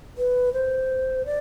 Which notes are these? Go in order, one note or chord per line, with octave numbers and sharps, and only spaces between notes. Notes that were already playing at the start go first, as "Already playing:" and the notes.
B4
C5
D5